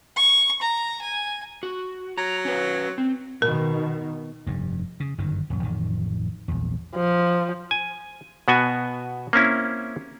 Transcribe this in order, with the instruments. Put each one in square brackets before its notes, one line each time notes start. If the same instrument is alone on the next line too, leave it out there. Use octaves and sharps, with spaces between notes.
[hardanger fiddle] C#6
A#5
G#5
[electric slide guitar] F#4
[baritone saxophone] F#3 [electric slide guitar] A#5
[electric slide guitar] C#4 B4
C4
[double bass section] B2 D#3 [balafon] A#4
[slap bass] F1 G2
C#3
G1 F#2 D#3
D#1 F#2
A1 F2 D#3
A#1 E2
[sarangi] F3
[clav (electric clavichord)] G#5
B2 B3 F#4 G#5
A#3 C4 C#4 E4